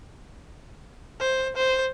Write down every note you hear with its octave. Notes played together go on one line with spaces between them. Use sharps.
C5
C5